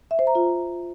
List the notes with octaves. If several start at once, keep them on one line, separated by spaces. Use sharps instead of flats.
E5
C5
A#5
F4